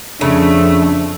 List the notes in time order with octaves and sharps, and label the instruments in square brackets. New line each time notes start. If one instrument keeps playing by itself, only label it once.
[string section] F2 [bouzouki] C#3 [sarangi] A3 [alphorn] D4